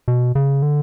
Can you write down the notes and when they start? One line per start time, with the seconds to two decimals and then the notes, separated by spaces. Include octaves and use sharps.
0.08 B2
0.35 C#3
0.62 D3